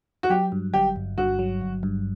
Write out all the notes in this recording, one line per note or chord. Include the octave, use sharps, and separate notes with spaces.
F#4
F#3 G4
G2
G1 G4
G1
G2 F#4
F#3
G1
G2